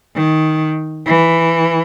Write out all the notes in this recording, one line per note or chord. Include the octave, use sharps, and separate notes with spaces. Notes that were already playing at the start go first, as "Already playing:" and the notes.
D#3
E3